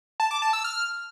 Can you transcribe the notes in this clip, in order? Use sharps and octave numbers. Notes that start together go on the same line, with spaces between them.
A5
D6
A5
E6
F6